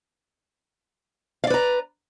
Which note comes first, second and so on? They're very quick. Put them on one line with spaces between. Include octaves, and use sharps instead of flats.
F5 D5 B4 A#5